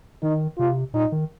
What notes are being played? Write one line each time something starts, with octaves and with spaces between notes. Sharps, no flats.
D#3 D#4
C3 F4
A#2 D#4
D#3